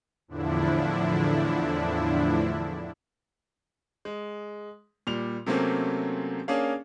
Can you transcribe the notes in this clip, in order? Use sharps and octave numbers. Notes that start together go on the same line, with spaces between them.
E2 A2 D3 F3 D4 E4
G#3
A#2 G3 F7
C3 F#3 A3 A#3 C4 C#4
A#3 C#4 D4 G#4 C#5 F5